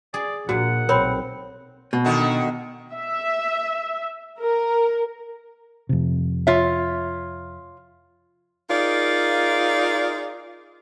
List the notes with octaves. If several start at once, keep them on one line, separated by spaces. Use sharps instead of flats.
G#4 D5
A#1 A#2 F#4 F#5
B1 C4 A#4 C#5 B5
B2
D3 D#3 F#4
E5
A#4
F2 C3
F4 C#5 E5
D#4 F4 G#4 A#4 D5